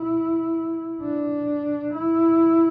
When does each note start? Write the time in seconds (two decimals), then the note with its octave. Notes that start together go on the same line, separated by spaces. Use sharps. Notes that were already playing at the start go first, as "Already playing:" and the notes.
Already playing: E4
1.03 D4
1.94 E4